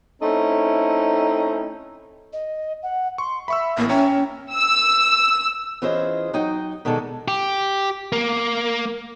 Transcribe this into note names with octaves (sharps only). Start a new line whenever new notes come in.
A3 C4 C#4 D#4 E4
D#5
F#5
C6 C#6
E5 B5 C#6 E6
A1 A2 A#3
C#4 C#5 E5 G5 A#5
E6
E3 C#4 F4 G#4 C5 D#5
F#3 D#4 D#5 G5
B2 D#3 G#3 D4 A4 D5
G4
A#3